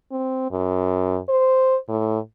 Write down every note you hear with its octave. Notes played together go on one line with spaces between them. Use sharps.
C4
F#2
C5
A2